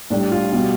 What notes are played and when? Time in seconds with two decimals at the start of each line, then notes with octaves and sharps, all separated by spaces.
0.10 A2 G3 D4
0.32 F4
0.52 B2 G3